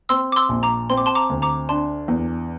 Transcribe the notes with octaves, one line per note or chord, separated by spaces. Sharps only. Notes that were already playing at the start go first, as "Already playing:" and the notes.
C4 C6 E6
D6
C6 E6
A#1
A#5 D6
C4 C6
D6
A5 C6
A#5 D6
D2
A#5 D6
D4 A5 C6
E2